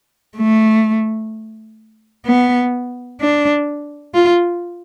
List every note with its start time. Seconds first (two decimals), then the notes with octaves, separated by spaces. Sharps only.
0.37 A3
2.26 B3
3.20 D4
4.14 F4